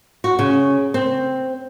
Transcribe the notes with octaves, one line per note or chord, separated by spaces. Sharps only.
F#4
C#3
C4